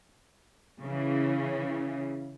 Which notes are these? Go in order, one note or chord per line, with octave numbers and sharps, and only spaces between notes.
C#3 E3